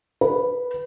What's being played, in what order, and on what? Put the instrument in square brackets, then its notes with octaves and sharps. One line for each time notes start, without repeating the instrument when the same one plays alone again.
[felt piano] B4